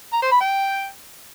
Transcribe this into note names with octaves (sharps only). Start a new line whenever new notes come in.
A#5
C5
B5
G5